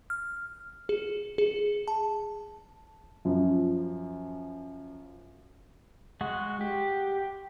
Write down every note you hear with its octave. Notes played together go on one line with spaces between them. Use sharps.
F6
G#4
G#4
A5
F#2 F3
G#3 F#4 F#5
G4